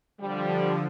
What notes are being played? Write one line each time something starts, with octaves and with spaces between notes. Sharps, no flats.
D3 F3 G3